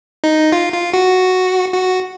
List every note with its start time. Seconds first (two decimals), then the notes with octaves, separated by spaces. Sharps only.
0.24 D#4
0.52 F4
0.73 F4
0.94 F#4
1.73 F#4